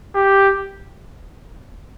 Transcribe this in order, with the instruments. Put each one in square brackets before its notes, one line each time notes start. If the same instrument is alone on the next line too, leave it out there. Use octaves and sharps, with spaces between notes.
[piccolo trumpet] G4